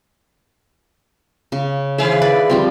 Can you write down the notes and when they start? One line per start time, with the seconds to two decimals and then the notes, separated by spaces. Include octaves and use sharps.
1.52 C#3
1.98 D#3 E4 G#4 E5 F5
2.22 B4 D5 B5
2.50 F3 G3 C4